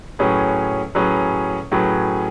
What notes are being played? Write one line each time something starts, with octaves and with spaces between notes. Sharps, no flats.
A2 F#3 C#4 G#4 B4
A2 F#3 C#4 G#4 B4
A2 F#3 C#4 G#4 B4